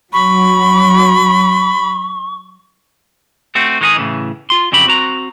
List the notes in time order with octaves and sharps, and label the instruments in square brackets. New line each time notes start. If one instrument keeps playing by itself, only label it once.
[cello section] F#3 [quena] B5 [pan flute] C#6
[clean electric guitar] A3 C4 F#4
D#3 G#3 D#4 G4 G#4
A2 C#3 E3
F4 C6
F2 C#3 F#3 G4 B5
C4 F#4 A#5